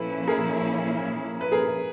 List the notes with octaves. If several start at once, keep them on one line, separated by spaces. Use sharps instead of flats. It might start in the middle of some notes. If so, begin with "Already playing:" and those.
Already playing: A#2 F3 A#3 C#4 E4 A4 B4
G#4 A#4
B4
G#4 A#4